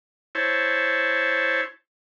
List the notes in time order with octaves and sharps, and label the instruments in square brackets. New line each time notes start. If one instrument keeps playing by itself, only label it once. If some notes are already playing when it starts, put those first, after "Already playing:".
[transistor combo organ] E4 C5 C#5 A5